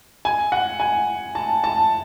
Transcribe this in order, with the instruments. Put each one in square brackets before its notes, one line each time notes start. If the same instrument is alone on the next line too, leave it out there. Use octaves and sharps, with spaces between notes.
[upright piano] G#5
F#5
G#5
A5
A5